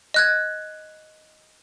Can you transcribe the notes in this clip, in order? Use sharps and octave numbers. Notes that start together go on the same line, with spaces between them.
D#5 F#6 G#6